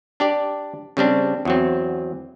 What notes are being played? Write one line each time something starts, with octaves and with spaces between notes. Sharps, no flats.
D4 G4 D5
C#3 G3 C4 D4
E2 F#3 C4